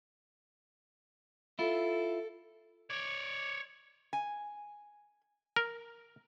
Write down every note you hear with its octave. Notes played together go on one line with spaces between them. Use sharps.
E4 F4 A4
C#5 D5
G#5
A#4